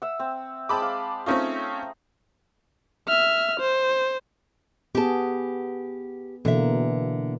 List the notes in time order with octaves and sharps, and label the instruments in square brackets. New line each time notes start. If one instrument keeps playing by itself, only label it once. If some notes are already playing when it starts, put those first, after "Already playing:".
[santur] E5 F#5
C4
[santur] G#3 C4 [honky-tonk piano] A5 B5 D6
[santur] F5
[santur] A3 D#4 [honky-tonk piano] C4 C#4 F4
[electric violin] E5 F6
C5
[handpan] B3 G#4 [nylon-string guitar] G4 A5
[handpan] B2 E3 A#3 [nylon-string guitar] D3 E5